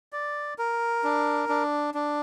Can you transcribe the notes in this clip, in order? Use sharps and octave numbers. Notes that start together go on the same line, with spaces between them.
D5
A#4
D4
D4
D4